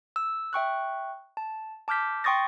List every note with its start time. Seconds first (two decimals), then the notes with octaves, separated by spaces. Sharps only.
0.16 E6
0.53 E5 G5 C#6 F#6
1.37 A5
1.88 A5 D6 F6 G6 B6
2.24 G5 C6 C#6 D#6 A6 A#6